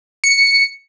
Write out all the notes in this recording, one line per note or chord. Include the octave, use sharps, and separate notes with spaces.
C#7